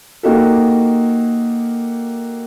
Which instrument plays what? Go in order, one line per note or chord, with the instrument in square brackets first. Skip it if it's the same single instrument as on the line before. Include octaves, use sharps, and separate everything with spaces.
[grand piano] A#3 D#4 F#4 G4 A4